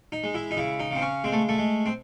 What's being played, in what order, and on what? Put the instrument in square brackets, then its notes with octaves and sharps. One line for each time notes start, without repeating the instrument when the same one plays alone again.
[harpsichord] D#4
G#3
E4
D#4
C#3 E4
D#4
C#3 C4
C#4
G#3 C4
A3
A3
G#3
C4